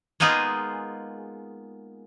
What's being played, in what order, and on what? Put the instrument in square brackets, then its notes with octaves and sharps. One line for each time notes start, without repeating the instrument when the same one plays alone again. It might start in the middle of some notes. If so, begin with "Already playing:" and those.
[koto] G#3 A#3 B3 D#4 F4 G#4